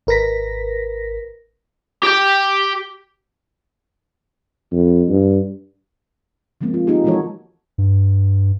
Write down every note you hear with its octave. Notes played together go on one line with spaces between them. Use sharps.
G#1 A#4 B4 A#6 B6
G4 G5
F2
G2
D3 F3 G#3 A#3 C4
F4
A#3 D#4 F4 G4 G#4
E3 F3 G#3 F#4 A4 C#5
G2